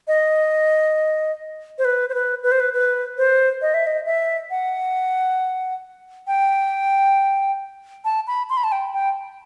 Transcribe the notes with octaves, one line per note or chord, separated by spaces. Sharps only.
D#5
C5
B4
C5
B4
B4
C5
B4
B4
C5
D#5
E5
D#5
E5
F#5
G5
A5
B5
C6
B5
A5
G5
G5